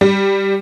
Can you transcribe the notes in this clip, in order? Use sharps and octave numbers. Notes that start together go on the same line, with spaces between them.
G3